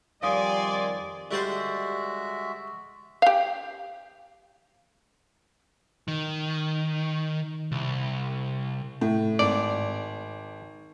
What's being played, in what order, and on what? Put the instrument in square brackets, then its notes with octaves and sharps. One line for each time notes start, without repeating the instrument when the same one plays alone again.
[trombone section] F2 G3 [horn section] D#3 D5 [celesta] F5 D#6 [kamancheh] G#5 C6
[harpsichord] D3 G3 C5 [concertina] G#3 F#4 E5
[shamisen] G4 F5
[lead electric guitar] D#3
C2
[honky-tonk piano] A2
[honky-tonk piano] G#1 [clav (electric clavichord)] D5